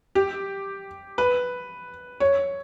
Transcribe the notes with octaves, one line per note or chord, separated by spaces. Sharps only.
G4
B4
C#5